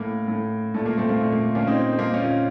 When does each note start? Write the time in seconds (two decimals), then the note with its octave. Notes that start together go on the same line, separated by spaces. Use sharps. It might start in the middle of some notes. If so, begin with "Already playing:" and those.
Already playing: A2 A#3
0.28 A2
0.74 A#2 A3
0.86 A#3
0.98 A3 C4
1.09 A#3
1.21 A#2 A3
1.32 A#3
1.55 A#3 C#4
1.67 A#2 C4 D#4
1.93 C4
1.99 A#3
2.14 A#2 C#4 F4